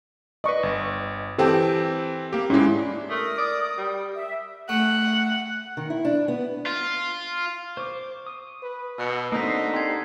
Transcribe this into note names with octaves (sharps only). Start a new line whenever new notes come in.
B4 D5 D#5 C#6
G1
E3 C4 G4 A4 G5
A#3 G4
G#2 G#3 C#4 E4
D4
A3 A#4 D#6
D5
G3
E5
A3 F#5
D#3
E4
D4
B3
F4
C5 C#6 D6
D#6
B4
B2 E6 F#6 C#7
D3 A#3 C4 D#4 C5 D#6 B6
G4 C5 C6 G#6